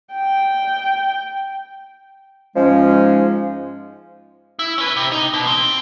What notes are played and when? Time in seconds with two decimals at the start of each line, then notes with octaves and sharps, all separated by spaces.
0.14 G5
2.56 G#2 F3 G#3 C#4
4.59 E4
4.78 C#4 B4
4.97 C3
5.12 D#4
5.33 B2
5.47 C4